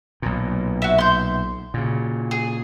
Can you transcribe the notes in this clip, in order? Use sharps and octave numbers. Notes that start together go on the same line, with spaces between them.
B1 A#2
F#4 E5
C6 G6
A#2 C#3
G#4